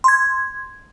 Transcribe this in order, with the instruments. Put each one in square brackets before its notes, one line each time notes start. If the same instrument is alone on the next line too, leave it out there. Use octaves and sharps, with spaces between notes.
[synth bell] C6 G#6